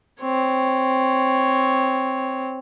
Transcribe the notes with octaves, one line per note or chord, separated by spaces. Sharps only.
C4 C#5